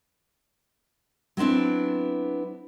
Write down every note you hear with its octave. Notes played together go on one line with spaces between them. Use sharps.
F#3 B3 C4 D4 E4